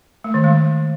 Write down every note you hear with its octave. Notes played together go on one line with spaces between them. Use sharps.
A3
D#3
G#3